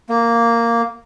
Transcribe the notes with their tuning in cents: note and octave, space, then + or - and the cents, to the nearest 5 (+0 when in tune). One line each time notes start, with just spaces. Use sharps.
A#3 -5